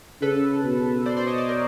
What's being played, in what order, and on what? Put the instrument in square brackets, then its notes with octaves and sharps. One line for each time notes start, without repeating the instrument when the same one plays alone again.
[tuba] C#3 [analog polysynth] A4 B4
[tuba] B2
[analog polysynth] C5 D5
C5 D5
C#5 D#5
C5 D5
A#4 C5